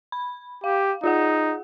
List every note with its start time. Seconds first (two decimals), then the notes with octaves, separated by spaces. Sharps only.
0.12 B5
0.64 G4 F5
1.04 D#4 F4 G#4 F#5